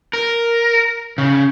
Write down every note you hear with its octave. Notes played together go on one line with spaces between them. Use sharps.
A#4
C#3